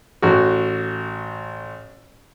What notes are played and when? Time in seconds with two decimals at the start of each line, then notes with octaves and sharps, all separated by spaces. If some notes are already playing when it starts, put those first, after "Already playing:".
0.22 A1 F#4